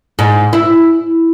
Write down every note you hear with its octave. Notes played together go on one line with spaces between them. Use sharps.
G#2
E4